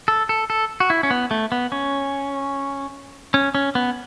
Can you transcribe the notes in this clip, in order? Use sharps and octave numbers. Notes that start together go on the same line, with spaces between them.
A4
A4
A4
F#4
E4
C#4
B3
A3
B3
C#4
C#4
C#4
B3